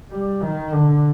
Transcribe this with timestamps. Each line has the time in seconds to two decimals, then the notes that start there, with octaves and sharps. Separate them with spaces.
0.11 G3
0.42 D#3
0.72 D3